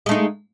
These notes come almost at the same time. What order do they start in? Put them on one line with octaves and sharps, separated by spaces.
G#3 A3 D#4